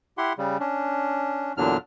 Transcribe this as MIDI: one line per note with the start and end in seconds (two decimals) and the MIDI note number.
0.18 0.33 64
0.18 0.33 67
0.18 0.33 78
0.18 0.33 84
0.38 0.58 49
0.38 0.58 55
0.60 1.53 61
0.60 1.53 62
1.57 1.77 40
1.57 1.77 46
1.57 1.77 50
1.57 1.77 54
1.57 1.77 62
1.57 1.77 89